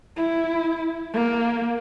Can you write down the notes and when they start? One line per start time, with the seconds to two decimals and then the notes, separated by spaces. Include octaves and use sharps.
0.17 E4
1.13 A#3